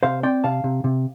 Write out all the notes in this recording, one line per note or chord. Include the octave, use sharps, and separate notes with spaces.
C3 C5 F5
C4 D5 G5
C3 F5 A5
C3
C3